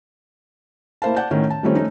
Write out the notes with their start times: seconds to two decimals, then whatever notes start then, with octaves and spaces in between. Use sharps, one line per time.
1.02 A#3 E4 C5 F5 A5
1.16 D5 F#5 A5 G6
1.31 A2 D#3 C#4
1.50 A5
1.63 D#3 F3 G3 A3 C4 C#4
1.75 A3 C#4 D#4